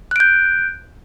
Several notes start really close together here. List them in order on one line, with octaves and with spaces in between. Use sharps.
F#6 D7 G6